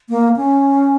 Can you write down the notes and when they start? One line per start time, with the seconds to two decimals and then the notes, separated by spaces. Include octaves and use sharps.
0.10 A#3
0.37 C#4